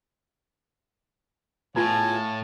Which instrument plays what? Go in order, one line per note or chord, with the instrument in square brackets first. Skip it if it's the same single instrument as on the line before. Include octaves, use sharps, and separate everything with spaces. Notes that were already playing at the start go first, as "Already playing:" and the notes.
[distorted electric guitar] A2 [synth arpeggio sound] B3 F4 G#4 [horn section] C#5 F5 A5 [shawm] G#5